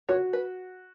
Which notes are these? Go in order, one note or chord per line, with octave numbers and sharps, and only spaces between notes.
F#4 C#5
B4